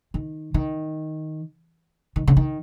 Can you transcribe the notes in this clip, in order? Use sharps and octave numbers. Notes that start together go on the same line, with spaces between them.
D#3
D#3
D#3
C#3
D#3